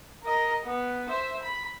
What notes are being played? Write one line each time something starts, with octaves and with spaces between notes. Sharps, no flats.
A#4 D#5
B3
C5 E5
B5